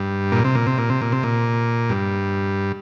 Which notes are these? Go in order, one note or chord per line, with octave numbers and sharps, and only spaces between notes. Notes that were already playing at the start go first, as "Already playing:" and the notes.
Already playing: G2
A#2
C3
A#2
C3
A#2
C3
A#2
C3
A#2
G2